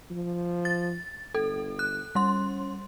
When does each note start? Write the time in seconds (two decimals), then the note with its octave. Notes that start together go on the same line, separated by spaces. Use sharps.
0.11 F3
0.65 A6
1.35 G1 A4
1.79 F#6
2.15 G3 C#4 C6